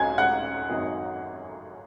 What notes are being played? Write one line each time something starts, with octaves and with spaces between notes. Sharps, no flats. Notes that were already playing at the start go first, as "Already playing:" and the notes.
Already playing: C#2 C#3 G#3 F#4 G#5 G#6
F#5 F#6
G#1 F#2 F#3 D#4 G#4